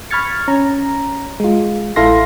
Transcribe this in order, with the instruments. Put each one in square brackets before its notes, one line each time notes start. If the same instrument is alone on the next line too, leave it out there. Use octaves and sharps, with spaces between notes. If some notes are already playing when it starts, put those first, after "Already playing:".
[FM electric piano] B5 C#6 F6 G#6 A6 C#7
C#4 A#5
G#3 F4
A1 E4 A4 F5 C6 A#6